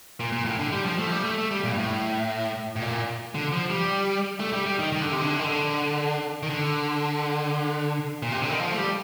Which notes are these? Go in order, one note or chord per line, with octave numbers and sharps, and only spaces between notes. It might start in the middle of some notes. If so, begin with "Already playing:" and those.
A#2
A#2
A2
D3
G3
F3
A3
F3
G3
A3
A3
G3
A#2
G2
A2
A2
A#2
D3
F3
G3
A3
G3
G3
D#3
D#3
D3
C3
D3
D#3
D3
D#3
D3
A#2
C3
D3
D#3
F3
A3
G3